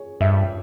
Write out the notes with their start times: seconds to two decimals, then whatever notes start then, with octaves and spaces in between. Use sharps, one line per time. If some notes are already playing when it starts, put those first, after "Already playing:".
Already playing: G#4 C#5
0.21 G2 E5